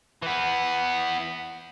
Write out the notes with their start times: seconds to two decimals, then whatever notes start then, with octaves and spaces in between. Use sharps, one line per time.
0.23 E3 B3